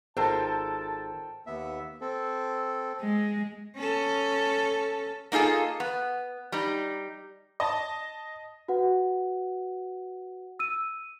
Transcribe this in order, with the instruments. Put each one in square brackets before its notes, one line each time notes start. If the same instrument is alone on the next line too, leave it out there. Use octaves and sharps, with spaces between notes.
[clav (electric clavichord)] G#1 [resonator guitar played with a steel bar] F4 A#4 C5 [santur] A4 G5 [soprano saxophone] A5
[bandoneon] D#2 B3 E5
C4 A4
[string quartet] G#3
[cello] C#4 A4
[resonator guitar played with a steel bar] A#3 D#4 F4 G#4 A4
B3
G3 D#4
[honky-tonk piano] D#5 A5
[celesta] F#4 B4 F#5
E6 D#7